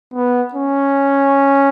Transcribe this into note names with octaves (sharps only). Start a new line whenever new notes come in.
B3
C#4